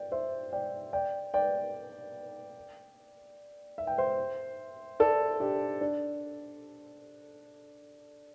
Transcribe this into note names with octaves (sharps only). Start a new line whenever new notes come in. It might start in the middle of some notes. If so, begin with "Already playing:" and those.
Already playing: D5 G5
C5 E5
D5 G5
D5 G5
D5 G5
E5
G5
C5 E5
A4 D5
D4 G4
D4